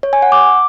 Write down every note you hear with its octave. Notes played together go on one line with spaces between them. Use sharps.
C#5
G#5
F#5
D6